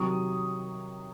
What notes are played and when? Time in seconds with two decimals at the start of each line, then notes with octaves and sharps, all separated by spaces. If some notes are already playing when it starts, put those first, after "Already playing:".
Already playing: C3 D#3 F#3 C#6 D#6